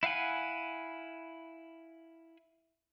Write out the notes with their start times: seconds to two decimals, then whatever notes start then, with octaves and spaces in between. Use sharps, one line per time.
0.03 E4 F5 F#5 G#5 B5